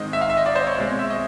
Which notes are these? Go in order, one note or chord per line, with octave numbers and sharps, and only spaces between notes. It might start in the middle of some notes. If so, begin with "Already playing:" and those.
Already playing: G#2 D#3 G#3 C4 D#5
E5
F5
E5
D#5
D5
C5
C#5
B2 G#3 C4
E5
D#5